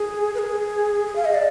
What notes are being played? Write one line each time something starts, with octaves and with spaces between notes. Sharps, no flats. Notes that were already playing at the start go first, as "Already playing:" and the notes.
Already playing: G#4
B4
G#4
G#4
F5
D#5
D5